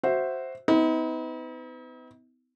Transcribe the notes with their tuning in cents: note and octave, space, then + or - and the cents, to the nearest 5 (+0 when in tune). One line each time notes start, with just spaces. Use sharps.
F#4 +5 C5 +0 E5 +0
B3 +40 D#4 +45